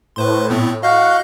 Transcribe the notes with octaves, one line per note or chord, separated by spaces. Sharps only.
A2 B4 C5 C6
A#2 B3 C4
F#4 D#5 F5 F#5 G6